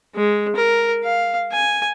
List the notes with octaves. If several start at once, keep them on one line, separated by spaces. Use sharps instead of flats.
G#3
A#4
F5
G#5